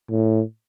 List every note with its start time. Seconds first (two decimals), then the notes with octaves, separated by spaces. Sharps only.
0.10 A2